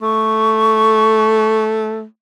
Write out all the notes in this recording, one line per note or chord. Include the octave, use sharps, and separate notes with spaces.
A3 C#6